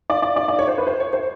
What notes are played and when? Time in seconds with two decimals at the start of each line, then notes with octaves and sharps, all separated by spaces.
0.10 D5
0.22 D5
0.36 D5
0.48 D5
0.59 C#5
0.68 C5
0.78 B4
0.87 C5
1.00 C#5
1.13 C5